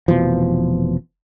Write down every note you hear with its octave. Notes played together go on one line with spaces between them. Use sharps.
F1 B2 E3 F3